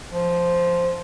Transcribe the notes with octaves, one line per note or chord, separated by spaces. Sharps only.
F3